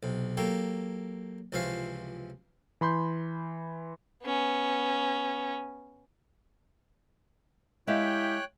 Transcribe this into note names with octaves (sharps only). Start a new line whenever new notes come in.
B1 C3
F#3 A#3 G4 A4 C#5
C#2 C3 E3 F3 C#5 F5
E3 B5 C6 G6
B3 C#4
G#3 E4 G4 C#5 E5 F5 G5 F#6